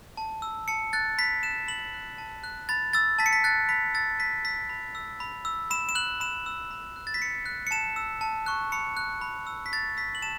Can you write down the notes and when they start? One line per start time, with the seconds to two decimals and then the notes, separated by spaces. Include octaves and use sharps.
0.17 A5
0.42 E6
0.68 A5 C#7
0.93 F#6 A6
1.18 B5 B6
1.43 F#6 E7
1.68 B5 F#7
1.94 F#6
2.18 A5
2.44 F#6
2.69 B5 A6
2.93 E6 A6
3.19 A5 B6
3.26 C#7
3.33 B6
3.44 F#6 A6
3.69 B5 B6
3.94 E6 A6
4.19 A5 B6
4.45 E6 B6
4.69 B5
4.95 E6
5.20 B5
5.45 E6
5.70 B5 E7
5.89 E7
5.95 F#6 F#7
6.20 B5 E7
6.46 E6
6.71 B5
6.96 F#6
7.07 A6
7.14 B6
7.22 B5 C#7
7.46 F#6
7.67 C#7
7.71 A5 E7
7.96 E6
8.21 A5
8.46 C#6 F#6
8.72 B5 C#7
8.97 F#6
9.21 B5
9.47 E6
9.66 B6
9.73 B5 A6
9.97 E6 B6
10.15 F#7
10.22 A5 E7